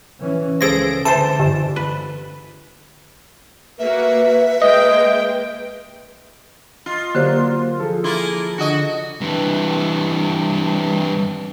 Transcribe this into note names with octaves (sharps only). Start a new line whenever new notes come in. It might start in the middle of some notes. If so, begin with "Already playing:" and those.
E3 C#4
C#2 F3 G#4 A4 A#6 D7
D3 E3 C5 A5
G1
B4
A#3 F#4 B4 E5
G#3 A#3 D#5 G5
F4 D#5
D3 F#3 A#3 G4 C5
F3 G#4 A4
A#3 E4 F4
D3 F#4 D#5
G2 E3